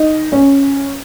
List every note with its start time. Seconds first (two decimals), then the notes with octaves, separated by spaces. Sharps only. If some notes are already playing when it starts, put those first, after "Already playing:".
Already playing: D#4
0.32 C#4